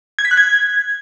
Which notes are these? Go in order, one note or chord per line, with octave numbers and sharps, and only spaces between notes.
G#6
B6
F#6
G#6